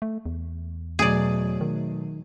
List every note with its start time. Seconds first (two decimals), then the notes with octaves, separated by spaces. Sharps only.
0.02 A3
0.26 E2
0.99 B2 F#3 A3 G#4 D5
1.61 D#3